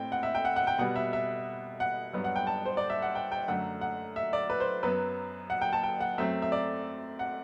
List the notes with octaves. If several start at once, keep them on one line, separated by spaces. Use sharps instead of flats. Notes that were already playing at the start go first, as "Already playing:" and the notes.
Already playing: A2 C4 G5
F#5
E5
G5
F#5
F#5
G5
B2 G3 B3 F#5
E5
E5
F#5
G2 F#3 B3
F#5
G5
A5
C5
D5
E5
F#5
G5
G5
F#2 D3 F#3 A3 F#5
F#5
E5
D5
B4
C5
F#2 F#3 B3 B4
F#5
G5
A5
G5
F#5
F#2 F#3 A3 C4 E5
E5
D5
F#5